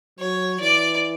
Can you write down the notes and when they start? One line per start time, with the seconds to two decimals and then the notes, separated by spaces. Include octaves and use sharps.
0.19 F#3 C#5
0.60 E3 D5